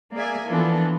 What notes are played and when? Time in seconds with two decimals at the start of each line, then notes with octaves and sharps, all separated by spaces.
0.14 A#3 G#4 D5 E5 G#5
0.49 E3 F3 B3 D4 F4 A4